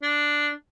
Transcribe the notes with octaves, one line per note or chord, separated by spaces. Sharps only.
D4